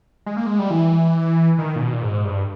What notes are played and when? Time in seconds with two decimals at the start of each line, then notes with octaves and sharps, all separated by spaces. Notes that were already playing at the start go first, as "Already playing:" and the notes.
0.26 G#3
0.37 A#3
0.46 G#3
0.59 G3
0.70 E3
1.58 D#3
1.76 A#2
1.80 B2
1.93 A#2
2.03 G#2
2.25 G2